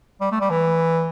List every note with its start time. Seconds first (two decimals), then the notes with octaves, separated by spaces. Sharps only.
0.21 G3
0.32 A3
0.41 G3
0.50 E3